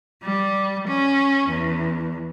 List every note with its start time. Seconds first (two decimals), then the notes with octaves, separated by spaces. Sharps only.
0.23 G3
0.87 C#4
1.49 E2